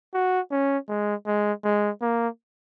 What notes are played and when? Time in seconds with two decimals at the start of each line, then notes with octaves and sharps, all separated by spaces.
0.14 F#4
0.51 C#4
0.88 G#3
1.26 G#3
1.64 G#3
2.02 A#3